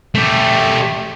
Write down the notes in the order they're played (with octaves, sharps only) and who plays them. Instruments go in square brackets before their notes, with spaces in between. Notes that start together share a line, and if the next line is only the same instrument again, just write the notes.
[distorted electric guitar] A3 G4